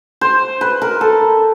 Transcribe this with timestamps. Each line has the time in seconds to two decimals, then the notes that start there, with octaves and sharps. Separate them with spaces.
0.21 C5
0.61 B4
0.82 A#4
1.01 A4